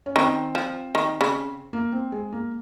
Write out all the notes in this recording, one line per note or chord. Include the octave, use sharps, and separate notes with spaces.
C#4
D#3 C4
F3
D#3
C#3
A#3
C4
G#3
A#3